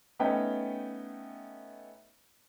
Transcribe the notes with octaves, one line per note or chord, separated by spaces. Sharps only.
A3 B3 C#4 D#4 G5